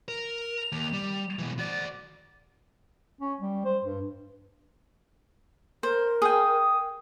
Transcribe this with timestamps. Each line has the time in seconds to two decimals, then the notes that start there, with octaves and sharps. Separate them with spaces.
0.08 A#4 F7
0.72 D#2
0.93 G3
1.39 B2 E3
1.59 F#4 D5 A6
3.21 C#4
3.41 G3
3.65 C5
3.84 G2
5.83 A#4 C5
6.22 G#4 G5 D#6